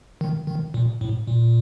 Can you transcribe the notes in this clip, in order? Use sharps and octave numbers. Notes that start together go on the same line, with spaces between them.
D#3
D#3
A#2
A2
A#2